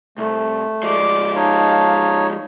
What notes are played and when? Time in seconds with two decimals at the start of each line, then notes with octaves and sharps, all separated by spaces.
0.18 C2 A3
0.83 F3 G#3 D5 D6
1.36 D#4 C#5 F5 A5